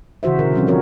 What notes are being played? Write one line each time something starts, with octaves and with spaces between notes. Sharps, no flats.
C#3 E3 F#4 C5 E5
B2 D3 G#4 A#4
F3 G3 C4 C#4
F3 C4 F4 F#4 A#4 C#5